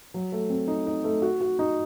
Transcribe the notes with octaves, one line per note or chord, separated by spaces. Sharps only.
F#3
A3
C4
D#4
D#4
A3
F#4
F#4
D#4